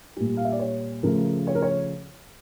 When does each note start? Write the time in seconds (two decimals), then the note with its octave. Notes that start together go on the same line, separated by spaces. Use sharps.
0.17 A#2 G3
0.37 F5
0.45 E5
0.52 D5
0.59 C#5
1.03 C#3 F3 A3 A#4
1.47 C#5
1.55 A#4
1.62 C#5